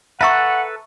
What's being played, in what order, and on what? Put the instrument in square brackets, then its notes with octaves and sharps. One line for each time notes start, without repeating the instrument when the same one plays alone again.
[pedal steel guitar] A4 B4 [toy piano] E5 A#5 C#6 [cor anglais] F#5